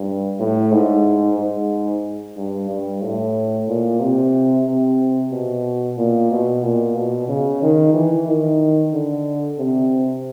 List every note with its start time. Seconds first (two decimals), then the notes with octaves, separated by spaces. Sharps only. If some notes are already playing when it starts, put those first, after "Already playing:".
Already playing: G2
0.40 A2
0.72 G#2
1.38 G#2
2.37 G2
2.69 G2
3.02 A2
3.68 A#2
4.00 C3
4.66 C3
5.31 B2
5.97 A#2
6.31 B2
6.63 A#2
6.95 B2
7.28 C#3
7.62 D#3
7.94 E3
8.27 D#3
8.93 D3
9.58 C3